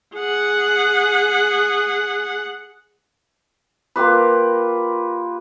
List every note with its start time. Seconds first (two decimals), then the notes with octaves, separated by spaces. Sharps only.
0.15 G#4 F#5
3.96 A#3 F4 G4 B4